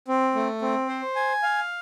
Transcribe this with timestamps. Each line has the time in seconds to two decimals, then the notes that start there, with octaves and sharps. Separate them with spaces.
0.08 C4
0.35 A3
0.62 C4
0.89 C5
1.16 G#5
1.43 F5